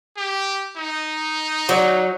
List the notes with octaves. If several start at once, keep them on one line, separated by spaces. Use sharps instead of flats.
G4
D#4
F#3 C#5 D5